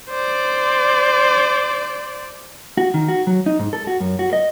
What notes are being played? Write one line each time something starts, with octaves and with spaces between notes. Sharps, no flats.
C5 D5
F#4
D#3
F#4
F#3
D#4
G#2
A4
F#4
F#2
F#4
D#5